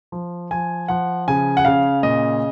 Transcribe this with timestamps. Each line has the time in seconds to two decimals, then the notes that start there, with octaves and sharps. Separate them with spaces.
0.12 F3
0.51 F3 G#5
0.88 F3 F#5
1.28 C#3 G#5
1.57 F#5
1.65 C#3 F5
2.03 A#2 D#5